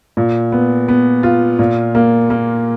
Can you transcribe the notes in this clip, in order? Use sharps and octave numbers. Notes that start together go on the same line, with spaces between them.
A#2
B3
B3
F4
A#2
A#3
A#3